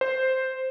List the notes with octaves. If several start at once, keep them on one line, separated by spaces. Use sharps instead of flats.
C5